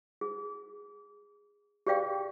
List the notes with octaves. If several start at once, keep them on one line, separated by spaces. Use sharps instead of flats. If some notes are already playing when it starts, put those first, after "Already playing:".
G#4
G4 G#4 D5 F5 G5